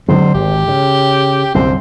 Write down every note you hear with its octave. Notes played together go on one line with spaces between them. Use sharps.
D3 F#3 G#3 C4
G#1 G4
C#3
C2 F#2 D3 C4